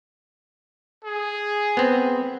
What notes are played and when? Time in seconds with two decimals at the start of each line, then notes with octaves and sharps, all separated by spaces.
1.04 G#4
1.77 B3 C4